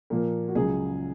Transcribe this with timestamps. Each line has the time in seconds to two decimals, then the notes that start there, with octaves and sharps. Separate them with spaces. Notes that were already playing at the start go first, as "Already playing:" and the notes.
0.10 A#2 F3 A#3
0.48 F#4
0.55 C#2 C#3 F#3 G#4